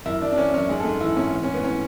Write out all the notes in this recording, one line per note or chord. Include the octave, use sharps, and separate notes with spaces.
F#2 E4
F#2 D4
D4
E3 C#4
F#2 C#4
G#2 G#4
G#2 A4
E3 E4
G#2 C#4
E3
C#4
A2
B3
A2 C#4